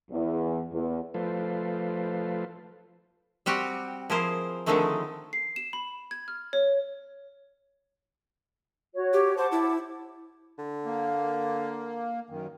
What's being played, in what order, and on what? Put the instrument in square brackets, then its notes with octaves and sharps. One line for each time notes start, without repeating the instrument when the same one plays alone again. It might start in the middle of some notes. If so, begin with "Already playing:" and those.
[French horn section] E2
E2
[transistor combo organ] F3 A3 F4 A4 B4 C5
[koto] G3 C4 F#4 G4
F3 E4 G#4 A#4 C5
D3 D#3 F3 G#3 A3 C4
[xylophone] C7
E7
B5
G#6
F6
C#5
[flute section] F#4 C#5
[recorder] G4
[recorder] C5 [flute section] F#5 A5 D6
[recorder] E4
[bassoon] D3
[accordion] A#3
F#2 D#3